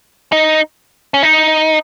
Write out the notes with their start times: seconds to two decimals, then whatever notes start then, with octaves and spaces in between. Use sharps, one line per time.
0.32 D#4
1.14 C#4
1.23 D#4